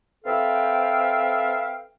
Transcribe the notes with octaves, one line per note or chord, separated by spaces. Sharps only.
C4 A4 B4 E5 F5 G5